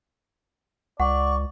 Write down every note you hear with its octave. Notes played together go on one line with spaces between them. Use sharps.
C#2 D5 F#5 C#6